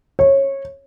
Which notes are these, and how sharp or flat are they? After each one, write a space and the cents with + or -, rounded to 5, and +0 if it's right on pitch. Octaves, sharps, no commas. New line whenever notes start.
C#5 -20